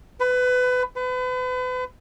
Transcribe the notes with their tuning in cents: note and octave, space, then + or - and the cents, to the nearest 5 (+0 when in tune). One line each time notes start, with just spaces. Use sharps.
B4 +25
B4 +35